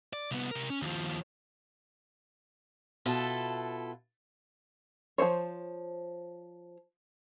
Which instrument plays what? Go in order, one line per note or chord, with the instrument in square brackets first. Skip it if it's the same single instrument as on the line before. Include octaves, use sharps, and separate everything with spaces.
[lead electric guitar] D5
C2 B3
C3 A#4
C#4
D#2 F3
[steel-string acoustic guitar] B2 E4 F4 A4
[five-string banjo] F3 F#3 C5 C#5